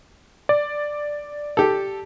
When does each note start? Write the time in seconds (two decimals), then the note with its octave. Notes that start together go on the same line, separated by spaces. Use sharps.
0.49 D5
1.57 G4 A4